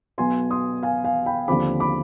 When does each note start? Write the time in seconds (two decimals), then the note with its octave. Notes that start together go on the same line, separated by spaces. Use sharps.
0.18 B1 B2 B3 G#5 C6
0.50 C6 D#6
0.83 F5 G#5
1.04 F5 G#5
1.26 G5 B5
1.48 D#2 D3 F3 C4 B5 D6
1.80 B5 D6